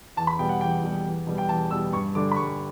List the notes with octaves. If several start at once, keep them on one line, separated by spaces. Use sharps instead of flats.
E2 A5
B5
B2 G3 G5
F#5
E2 G5
B2 G3
E2
B2 G3
G5
E2 A5
B2 G3 E6
G2 C#6
D3 G3 D4 D6
B5
G2 C#6